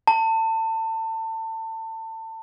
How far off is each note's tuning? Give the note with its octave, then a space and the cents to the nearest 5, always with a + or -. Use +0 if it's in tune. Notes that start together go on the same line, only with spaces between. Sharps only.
A5 +30